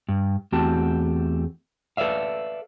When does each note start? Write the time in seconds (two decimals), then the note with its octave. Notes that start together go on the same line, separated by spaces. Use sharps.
0.08 G2
0.52 E2 A3 C4 F#4 G4 A5
1.97 A4 B4 D5 E5 F5